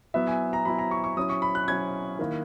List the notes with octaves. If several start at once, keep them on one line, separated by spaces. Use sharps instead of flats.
F#3 B3 E4 E5
G#5
A#5
F#3 B3 E4 B5
A#5
C#6
C#6
F#3 C#4 E4 D#6
C#6
B5
F#6
F#3 C#4 E4 G#6
D#3 A#3 E4